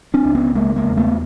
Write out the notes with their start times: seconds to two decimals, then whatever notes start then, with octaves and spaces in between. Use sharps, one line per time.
0.14 C4 D4
0.25 C#2
0.35 B3 C#4
0.55 C#3 G#3 A#3
0.76 G#3 A#3
0.87 E2
0.97 A3 B3